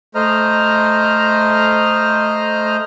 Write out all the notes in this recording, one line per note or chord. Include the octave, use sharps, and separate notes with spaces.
A3 C5 D#5 A#5 F6